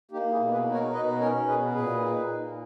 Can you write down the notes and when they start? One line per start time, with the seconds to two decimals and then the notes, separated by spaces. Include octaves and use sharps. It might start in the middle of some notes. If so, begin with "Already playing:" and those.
0.11 A#3 D#4 G4
0.31 E4 G#4
0.39 B2
0.52 G#4 B4
0.66 D#4
0.72 A#4 C#5
0.92 B2 B4 D#5
1.19 C#4 A#4 C#5
1.46 B2 G#4 B4
1.74 A#2 G#4 B4
2.00 D#4
2.28 A#2